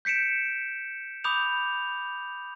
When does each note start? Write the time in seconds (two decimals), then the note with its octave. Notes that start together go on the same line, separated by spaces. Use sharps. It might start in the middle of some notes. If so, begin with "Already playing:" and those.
0.05 G6 B6 C#7 D7 E7
1.24 B5 D6 D#6 G6 F7